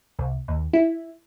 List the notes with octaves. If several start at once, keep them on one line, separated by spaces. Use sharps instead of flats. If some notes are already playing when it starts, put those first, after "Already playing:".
C2
D#2
E4